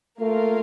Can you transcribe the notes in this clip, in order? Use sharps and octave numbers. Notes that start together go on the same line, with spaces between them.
A3 A#3 F4 A#4 F5